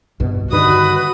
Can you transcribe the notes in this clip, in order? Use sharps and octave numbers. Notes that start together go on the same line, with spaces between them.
C2 G2 B2
G2 D3 D#3 F#4 B4 D#6